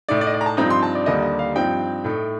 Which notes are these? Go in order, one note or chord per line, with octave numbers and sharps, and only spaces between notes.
A2 A3 D#4 D5
D5
D#5
D5
A#5
A5
G2 F3 C4 D#4 A#5
C6
A5
D5
D#2 D3 G3 A#3 D#5
D#5
F5
G2 F3 C4 D#4 G5
A2 A3 D#4